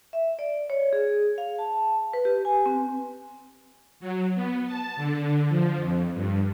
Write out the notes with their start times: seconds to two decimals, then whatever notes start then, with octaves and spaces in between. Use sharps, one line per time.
0.13 E5
0.39 D5
0.70 C#5
0.93 G#4
1.38 F5
1.59 A5
2.13 B4
2.25 G4
2.45 G#5
2.66 C4
4.00 F#3
4.35 B3
4.66 A5
4.96 D3
5.49 F3
5.78 F2
6.14 G2